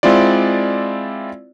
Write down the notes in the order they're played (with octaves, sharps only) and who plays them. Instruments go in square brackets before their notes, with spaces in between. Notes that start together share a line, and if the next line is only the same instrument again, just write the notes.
[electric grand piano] G#3 C4 E4 F4 D5